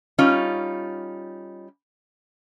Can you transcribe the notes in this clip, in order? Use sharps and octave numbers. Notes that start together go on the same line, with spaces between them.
G3 C#4 D#4 F4